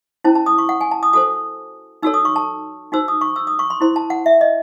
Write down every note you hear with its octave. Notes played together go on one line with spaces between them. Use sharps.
C#4 E4 C5 A5
A5
D#6
C#6
F#5
G#5
A5
D#6
F#4 A4 C5 D#6
D#4 F#4 A4 C#5 E6
D#6
C#6
A5
D#4 F#4 C5 E6
D#6
C#6
E6
D#6
C#6
C6
E4 C5 C6
A5
F#5
E5
D#5